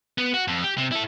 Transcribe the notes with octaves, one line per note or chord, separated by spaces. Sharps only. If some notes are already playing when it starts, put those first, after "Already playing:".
B3
F#4
F2
G4
C3
E4 A4